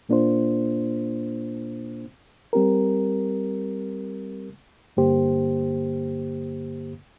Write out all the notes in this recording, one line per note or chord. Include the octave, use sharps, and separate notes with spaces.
A#2 A#3 D4 F4 C5
G3 C4 G4 A#4
G2 D3 A#3 G4 C5